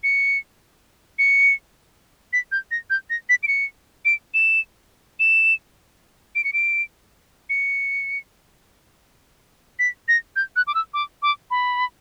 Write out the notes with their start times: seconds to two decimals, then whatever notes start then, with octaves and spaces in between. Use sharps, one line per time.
0.03 C#7
1.19 C#7
2.33 B6
2.52 G6
2.71 A#6
2.90 G6
3.10 A#6
3.29 B6
3.43 D7
3.48 C#7
4.05 D7
4.34 E7
5.20 E7
6.35 D7
6.44 C#7
6.53 D7
7.50 C#7
9.79 B6
10.08 A#6
10.36 G6
10.56 F#6
10.67 D6
10.74 E6
10.94 D6
11.22 D6
11.51 B5